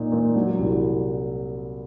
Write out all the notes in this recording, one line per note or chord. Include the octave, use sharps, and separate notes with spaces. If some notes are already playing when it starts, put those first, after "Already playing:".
Already playing: A#2 D#4
A#2
F#3
C2